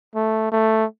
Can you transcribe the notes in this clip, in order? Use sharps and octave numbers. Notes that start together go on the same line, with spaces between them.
A3
A3